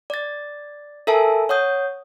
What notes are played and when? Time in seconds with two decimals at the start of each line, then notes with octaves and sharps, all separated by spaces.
0.10 D5 A6
1.07 A4 A#4 E5 G#5 A5
1.49 C#5 F#5 D#6 G6